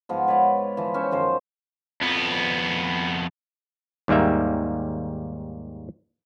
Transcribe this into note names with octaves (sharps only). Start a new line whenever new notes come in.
G#2 F3 B3
B4 C#5 D5 F#5
E3 F3
C#4 C5 E5
F#2 D#3 F3 C5
F2 B3
D#2 G#2 G3 A#3 E5